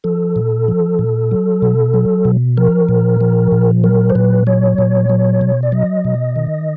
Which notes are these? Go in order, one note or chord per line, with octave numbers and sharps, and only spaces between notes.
F3 A4
A#2
F3
A#2
F#3
B2
F#3
B2
F3 A#4
A#2
F3
A#2
F#3 A#4
C5
A#2 B4
F#3 C#5
A#2
F#3
B2
D5
F#3 D#5
B2
D#3